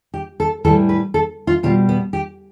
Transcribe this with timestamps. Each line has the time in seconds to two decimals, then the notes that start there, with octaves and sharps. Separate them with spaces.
0.14 G4
0.40 A4
0.64 A2 E3 G3 A4
0.89 B4
1.14 A4
1.47 F4
1.63 B2 G3 F4
1.89 B3
2.13 G4